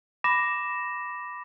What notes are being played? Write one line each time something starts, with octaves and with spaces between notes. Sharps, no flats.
B5 D6 A#6 E7